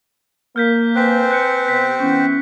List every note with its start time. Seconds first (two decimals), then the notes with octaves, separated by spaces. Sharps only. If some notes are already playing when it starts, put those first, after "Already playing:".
0.56 A#3 F6 G6 B6
0.96 C4 B4 C5 G#5 F#6 B6
1.31 F#6 C#7
1.68 C3 B3 B6
2.00 E3 B3 C#4